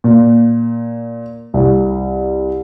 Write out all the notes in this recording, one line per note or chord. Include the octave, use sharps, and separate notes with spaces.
A#2
C2